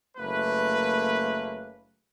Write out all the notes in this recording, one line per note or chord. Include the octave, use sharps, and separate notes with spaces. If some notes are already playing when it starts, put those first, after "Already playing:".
F#1 A3 A#3 B4